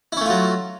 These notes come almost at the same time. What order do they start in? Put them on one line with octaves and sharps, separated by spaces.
E4 C#4 A3 F4 F#3